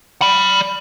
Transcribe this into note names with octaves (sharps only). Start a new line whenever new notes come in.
D5 B5